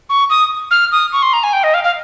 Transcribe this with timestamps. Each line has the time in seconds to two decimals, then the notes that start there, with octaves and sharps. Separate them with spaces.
0.10 C#6
0.30 D#6
0.71 F6
0.92 D#6
1.13 C#6
1.22 C6
1.33 A#5
1.43 G#5
1.53 G5
1.64 D#5
1.74 F5
1.84 F5